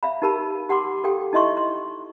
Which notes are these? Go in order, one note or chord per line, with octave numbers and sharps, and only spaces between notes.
E5 F5 B5
D#4 G4 A#4 A5 B5
G4 F#5 B5 C6 D6
G4 A4 F5 G5
D#4 E4 D#5 E5 C6 C#6
C6